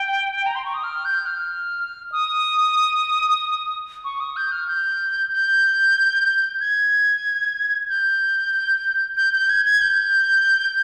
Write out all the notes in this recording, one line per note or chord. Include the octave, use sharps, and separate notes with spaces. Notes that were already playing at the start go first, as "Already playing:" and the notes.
Already playing: G5
A#5
C6
C#6
D#6
F6
G6
F6
D#6
C#6
D#6
G6
F6
G6
G6
G#6
G6
G6
G6
G#6
G#6
G6